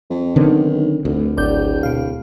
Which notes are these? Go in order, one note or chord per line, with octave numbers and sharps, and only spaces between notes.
F2
B1 D3 D#3 C4
F1 D2
D1 G#1 D5 G6
B2 F5